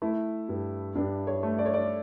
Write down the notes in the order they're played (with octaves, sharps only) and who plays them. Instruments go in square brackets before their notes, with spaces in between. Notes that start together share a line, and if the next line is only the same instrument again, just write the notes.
[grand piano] A3 [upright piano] E4
[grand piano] G2
[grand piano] G2 [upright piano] D4
[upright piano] C#5
[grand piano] A3
[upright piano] D5
C#5
D5